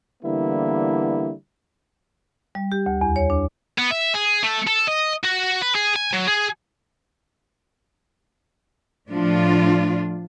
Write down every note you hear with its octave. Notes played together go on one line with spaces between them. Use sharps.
D3 E3 G3 A#3 B3 E4
G3
G4
D2
E2
C#5
D4
B3
E5
G#4
A3
A4
D#5
F#4
B4
G#4
G#5
F#3
G#4
A2 F3 D4 F4